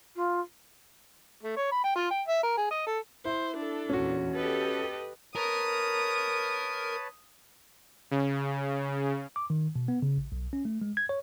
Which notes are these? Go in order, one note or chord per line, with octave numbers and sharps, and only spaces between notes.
F4
A3
C#5
B5
G5
F4
G5
E5
A#4
G#4
D#5
A4
E4 C5
D4 A4
E2 A#2 C#4 F#4
G4 A4 B4 D#5
A#4 B4 C#5 A5 D#6
C#3
D6
D#3
B2
B3
C#3
A1
B1
C#4
A3
G#3
G#6
C#5